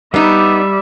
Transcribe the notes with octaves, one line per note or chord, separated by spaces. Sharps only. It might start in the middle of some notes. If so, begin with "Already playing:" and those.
G3 B3 D#4 D5 E5